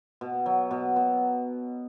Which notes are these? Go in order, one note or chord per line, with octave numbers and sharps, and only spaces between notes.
B2
F#3
B2
B2